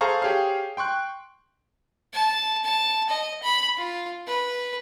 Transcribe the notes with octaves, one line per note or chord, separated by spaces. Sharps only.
G#4 A4 C5 F5 A#5 C#6
G4 G#4 C#5 F5
G5 C6 C#6 F#6
A5
A5
D#5
B5
F4
B4